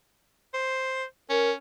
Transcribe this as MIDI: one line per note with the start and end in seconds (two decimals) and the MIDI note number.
0.54 1.05 72
1.29 1.54 61
1.29 1.49 70